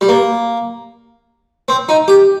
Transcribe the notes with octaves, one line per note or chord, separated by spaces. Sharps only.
G3
A#3
C4
D#4
G4